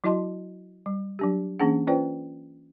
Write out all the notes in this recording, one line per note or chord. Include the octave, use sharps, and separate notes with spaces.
F#3 E4 F#4 D#5 A5 C6
G3
F#3 D4 G4
E3 A#3 C#4 D4 G#4 F#5
C#4 F4 B4 C5 D5 G5